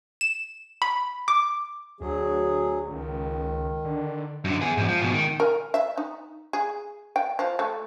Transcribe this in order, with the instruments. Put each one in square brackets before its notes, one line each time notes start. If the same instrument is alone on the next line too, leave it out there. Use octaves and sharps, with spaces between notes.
[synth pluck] E7
B5
D6
[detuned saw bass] D2 [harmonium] F#3 G#4
[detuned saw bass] C#2 [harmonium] D#3
[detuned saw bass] D3
[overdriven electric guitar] F#2 D3
B3 G#4
E2 G#2
F3
G#2 B2
D#3
[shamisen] A#4
E5
D#4
G#4
G5
F3
A3